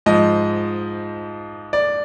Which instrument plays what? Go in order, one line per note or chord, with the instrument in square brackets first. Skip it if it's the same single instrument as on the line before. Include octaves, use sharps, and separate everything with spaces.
[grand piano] G#2 F3 D#5
D5